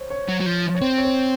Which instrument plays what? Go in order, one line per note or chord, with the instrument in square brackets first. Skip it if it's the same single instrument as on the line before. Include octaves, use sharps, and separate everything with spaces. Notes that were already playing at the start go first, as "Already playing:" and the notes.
Already playing: [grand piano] C5 C#5
C#5
[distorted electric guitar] F#3
F#3
F3
[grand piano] C#5
[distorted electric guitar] C4 [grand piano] C5
[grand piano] C#5
C5